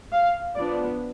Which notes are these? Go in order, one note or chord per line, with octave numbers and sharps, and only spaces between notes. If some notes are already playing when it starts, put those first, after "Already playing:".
F5
F3 B3 D4 D5